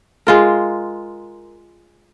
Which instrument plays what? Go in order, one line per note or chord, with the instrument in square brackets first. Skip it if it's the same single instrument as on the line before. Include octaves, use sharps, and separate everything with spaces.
[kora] G#3 F4 A#4